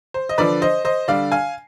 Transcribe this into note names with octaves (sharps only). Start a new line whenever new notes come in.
C5
D#5
D3 F3 B4 D5
C5 D#5
C5 D#5
D3 G3 D5 F5
F5 G#5